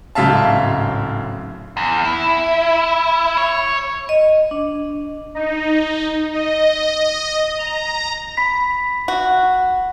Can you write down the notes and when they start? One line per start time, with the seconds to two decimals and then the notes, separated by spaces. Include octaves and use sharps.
0.15 D1 G#2 C#3 E5 F5 A5
1.77 E2
2.05 E4
3.37 C#5
4.09 D#5
4.51 D4
5.35 D#4
6.33 D#5
7.58 A#5
8.37 B5 B6
9.08 F#4